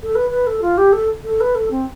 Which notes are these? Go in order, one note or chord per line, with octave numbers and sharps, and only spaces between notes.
A4
B4
B4
A4
F4
G4
A4
A4
B4
A4
C4